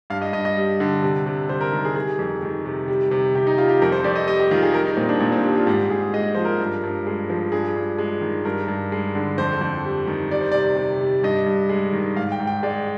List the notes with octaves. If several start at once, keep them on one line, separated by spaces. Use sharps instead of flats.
G2 F5
D#5
G2 D#5
D#5
G3
D3
C3
C3
G3 C5
A#4
D#3
G#4
G3 G#4
F2
D#3
C3
G3
C3
C3 G4
D#4
G3 F4
G4
F2 A#4
C5
F2 D5
D#5
G3 D#5
G4
D#3 F4
G#4
G3 A#4
D#4
A#2 C4
D4
A#2
C4
G3 D4
F4
G#2 G4
G#2 G#4
G#3 D#5
F3 C5
A#4
G2
G2
G#3
F3
G2 G#4
G2
G#3
D#3
G2 A#4
G2
G#3
D3
F2 C5
F2
G3
D#3
G3 D5
C5
C3 D5
C3
G3
G2 D#5
G2
G#3
D#3
G#2 F5
G5
G#2
G5
G#3 D5